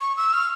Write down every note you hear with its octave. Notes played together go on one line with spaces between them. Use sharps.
C#6
E6
F6